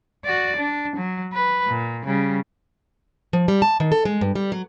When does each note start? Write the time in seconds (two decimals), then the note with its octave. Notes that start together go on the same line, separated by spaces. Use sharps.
0.25 F#4 D5
0.57 D4
0.97 F#3
1.33 B4
1.67 A#2
2.05 C#3 G3
3.33 F3
3.48 G3
3.62 A5
3.80 D#3
3.92 A4
4.05 G#3
4.21 G2
4.35 G3
4.52 F#3